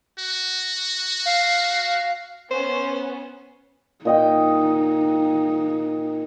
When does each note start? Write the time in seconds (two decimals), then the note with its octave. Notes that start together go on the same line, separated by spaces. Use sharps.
0.19 F#4
1.26 F5
2.51 B3 C#4 C5
4.05 A#2 D#4 D#5 G5